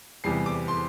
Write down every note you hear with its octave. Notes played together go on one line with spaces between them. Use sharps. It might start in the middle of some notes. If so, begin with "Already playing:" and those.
E2 C3 E3 G3 C7
D6
C6